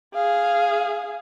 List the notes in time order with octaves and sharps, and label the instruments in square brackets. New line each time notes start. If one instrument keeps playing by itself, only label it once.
[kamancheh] G#4 F5